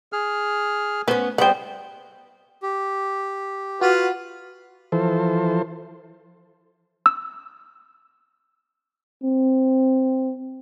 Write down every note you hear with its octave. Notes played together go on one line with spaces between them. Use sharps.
G#4 F6
B3 C#4 B4 C5
G3 B3 C4 C5 F#5 G5
G4
F4 F#4 B4
E3 F3 A4 C5
E6
C4